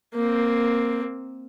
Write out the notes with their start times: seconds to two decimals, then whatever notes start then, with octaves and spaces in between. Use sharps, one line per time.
0.14 A#3 C4